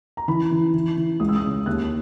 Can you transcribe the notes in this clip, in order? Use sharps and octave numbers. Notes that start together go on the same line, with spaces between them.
A#5
E3 B5
E3
E3
E3
C#2 D#6
E6
D#6
C#3
D#2 F#6